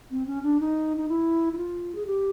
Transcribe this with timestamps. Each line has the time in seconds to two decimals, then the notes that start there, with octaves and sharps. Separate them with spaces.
0.11 C4
0.27 C#4
0.43 D4
0.60 D#4
0.97 D#4
1.09 E4
1.53 E4
1.58 F4
1.95 G#4
2.07 G4